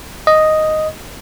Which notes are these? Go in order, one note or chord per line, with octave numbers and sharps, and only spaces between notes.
D#5